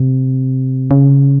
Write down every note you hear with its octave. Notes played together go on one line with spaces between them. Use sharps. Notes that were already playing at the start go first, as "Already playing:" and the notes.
Already playing: C3
C#3